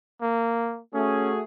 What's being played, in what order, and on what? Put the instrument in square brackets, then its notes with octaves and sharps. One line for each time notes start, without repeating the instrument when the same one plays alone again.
[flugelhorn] A#3
[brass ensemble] A3 F#4 G#4 [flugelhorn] C#4